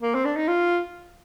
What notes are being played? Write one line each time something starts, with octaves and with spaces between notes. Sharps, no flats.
A#3
C4
D4
D#4
F4